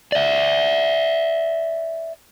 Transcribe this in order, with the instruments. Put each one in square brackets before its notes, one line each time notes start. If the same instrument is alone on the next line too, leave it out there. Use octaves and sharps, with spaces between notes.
[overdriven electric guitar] D5 E5